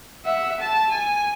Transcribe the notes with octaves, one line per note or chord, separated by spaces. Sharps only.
E5 F#5
A5
G#5